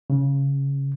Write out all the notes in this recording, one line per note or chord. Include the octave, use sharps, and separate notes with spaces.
C#3